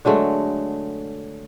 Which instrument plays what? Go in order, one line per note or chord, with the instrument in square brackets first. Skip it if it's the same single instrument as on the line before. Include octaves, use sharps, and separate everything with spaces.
[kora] D3 F#3 G#3 A3